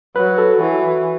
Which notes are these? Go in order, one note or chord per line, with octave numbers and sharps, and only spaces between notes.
F#3 B4
A4
E3 F#4